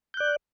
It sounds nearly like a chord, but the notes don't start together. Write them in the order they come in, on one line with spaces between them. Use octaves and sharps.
G6 F#6 D5